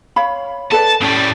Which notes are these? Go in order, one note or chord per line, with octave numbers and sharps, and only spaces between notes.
C#5 F5 B5
A4 B4 D5 A5
A2 G3 C#4 D5